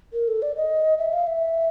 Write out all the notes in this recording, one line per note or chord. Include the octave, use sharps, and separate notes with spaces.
A#4
A4
D5
D#5
E5
F5
E5